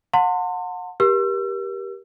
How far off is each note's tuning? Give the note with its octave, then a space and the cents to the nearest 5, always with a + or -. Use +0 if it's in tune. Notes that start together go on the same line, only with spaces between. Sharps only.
F#5 -35 A5 +45 C6 +0
G4 +0 A#4 +30 E6 +35